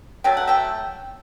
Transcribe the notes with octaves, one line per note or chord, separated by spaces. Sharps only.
F#3 A3 G5
F#5
E5 G5